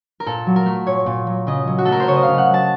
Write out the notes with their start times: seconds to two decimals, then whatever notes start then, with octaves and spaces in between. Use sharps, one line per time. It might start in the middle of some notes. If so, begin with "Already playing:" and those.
0.20 A#4
0.26 A#2 A4
0.47 F#3
0.56 A#4
0.66 A3
0.87 A#2 C#5
1.06 A#2
1.27 F#3
1.47 C#3 D#5
1.67 F#3
1.78 F#4
1.85 A3 A4
1.92 A#4
2.00 C5
2.08 C#3 C#5
2.16 D#5
2.23 F5
2.28 C#3
2.38 F#5
2.49 F#3
2.54 A5